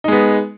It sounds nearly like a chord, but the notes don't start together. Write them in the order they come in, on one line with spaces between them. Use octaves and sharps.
D#4 G#3 B3